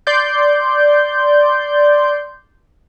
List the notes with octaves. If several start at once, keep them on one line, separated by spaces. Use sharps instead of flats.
D5 C6 G6